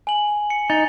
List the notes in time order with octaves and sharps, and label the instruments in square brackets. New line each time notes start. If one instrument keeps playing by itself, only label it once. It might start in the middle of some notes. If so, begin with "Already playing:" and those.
[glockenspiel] G#5 F#7
C#7
[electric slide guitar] D#4 [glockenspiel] A6